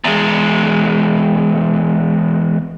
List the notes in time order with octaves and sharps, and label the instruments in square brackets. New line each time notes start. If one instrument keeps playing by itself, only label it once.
[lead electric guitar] E2 G#3